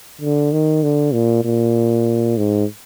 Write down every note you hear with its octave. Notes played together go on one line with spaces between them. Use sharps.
D3
D#3
D3
A#2
A#2
G#2